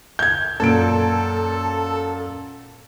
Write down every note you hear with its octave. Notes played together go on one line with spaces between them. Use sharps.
G6 G#6
F#2 A#2 A4 D7